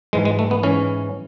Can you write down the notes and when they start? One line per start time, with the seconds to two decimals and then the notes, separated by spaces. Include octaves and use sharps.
0.13 G#2 E3 G#3
0.25 G#3
0.39 A3
0.51 B3
0.63 G#2 E3 C#4